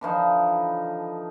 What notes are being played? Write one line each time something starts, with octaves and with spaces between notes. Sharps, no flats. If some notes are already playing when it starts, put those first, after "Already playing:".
D3 E3 F3 D#4